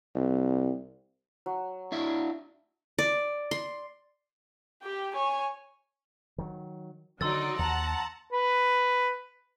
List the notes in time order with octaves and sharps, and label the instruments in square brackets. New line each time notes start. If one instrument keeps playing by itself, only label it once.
[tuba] C2
[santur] F#3
[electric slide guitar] D4 E4 E5
[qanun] D5
C6
[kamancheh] G4 G5
C#5 G#5
[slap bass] D#3 F#3
[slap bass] D3 D#3 [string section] F#3 D#4 D5 [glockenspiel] C6 E6 A6
[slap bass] D#2 [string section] F#5 A5 A#5
[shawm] B4